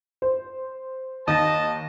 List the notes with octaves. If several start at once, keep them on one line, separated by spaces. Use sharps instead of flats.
C5
D#2 D#5 A5 A#6